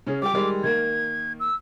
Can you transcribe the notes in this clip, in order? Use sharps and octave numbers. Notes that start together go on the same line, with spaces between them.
C#3 C#4 G#4
G3 G4 D6
D#3 G3 G#3
D#3 A#3 G#6
E6